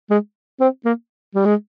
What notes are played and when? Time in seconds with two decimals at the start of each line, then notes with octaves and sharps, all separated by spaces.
0.10 G#3
0.60 C4
0.85 A#3
1.35 G3
1.45 G#3